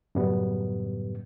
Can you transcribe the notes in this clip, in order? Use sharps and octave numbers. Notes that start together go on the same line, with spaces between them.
F#2 A2 C#3 G3 B3